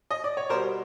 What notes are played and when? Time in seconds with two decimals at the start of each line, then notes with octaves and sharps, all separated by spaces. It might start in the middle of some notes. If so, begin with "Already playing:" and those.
0.11 D#5
0.24 D5
0.37 C#5
0.49 B2 A#4 C5
0.53 G3